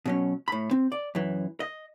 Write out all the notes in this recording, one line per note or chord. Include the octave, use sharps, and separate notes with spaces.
B2 F#3 C#4
A2 B5
C4
D5
F#2 E3
D#5